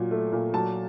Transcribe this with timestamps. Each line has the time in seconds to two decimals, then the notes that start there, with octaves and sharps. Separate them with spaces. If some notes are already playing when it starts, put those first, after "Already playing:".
Already playing: A#2 F#3
0.11 A3
0.32 A#2
0.53 F#3 A5